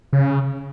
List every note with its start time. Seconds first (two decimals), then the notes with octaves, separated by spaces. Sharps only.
0.13 C#3